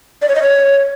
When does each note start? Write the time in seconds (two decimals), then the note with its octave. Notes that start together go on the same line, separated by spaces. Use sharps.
0.22 D5
0.29 C#5
0.35 D#5
0.42 C#5